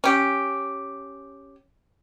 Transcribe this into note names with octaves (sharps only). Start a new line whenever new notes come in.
C#4 G4